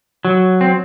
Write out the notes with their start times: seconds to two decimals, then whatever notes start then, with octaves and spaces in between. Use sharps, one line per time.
0.25 F#3
0.61 C4